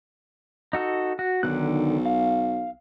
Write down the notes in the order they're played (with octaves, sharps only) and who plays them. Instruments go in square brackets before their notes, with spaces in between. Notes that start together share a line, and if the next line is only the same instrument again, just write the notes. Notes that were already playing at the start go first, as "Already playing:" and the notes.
[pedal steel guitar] D#4 F#4 A4
F#4
[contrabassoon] B1 [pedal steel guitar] D3 D#3 F#6
[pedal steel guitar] F5